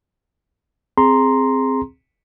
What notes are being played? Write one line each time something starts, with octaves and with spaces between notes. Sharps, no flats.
C4 G#4 A#5 C6